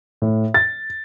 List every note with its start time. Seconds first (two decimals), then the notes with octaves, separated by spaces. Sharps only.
0.22 A2
0.54 A6